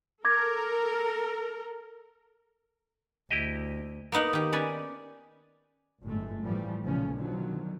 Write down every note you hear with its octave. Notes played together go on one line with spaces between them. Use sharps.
A4 A#4 D6 G#6 A#6
D2 E4 G4 D#5
A#3 B3 D#4 F#5
D#3 G4
C#4 B4 D5 G#5
G1 F#2 A2 G#3 A3
A2 E3 F3 G3 A3
B1 A#2 C#3 F3 A3 C#4
B2 D3 D#3 F3 F#3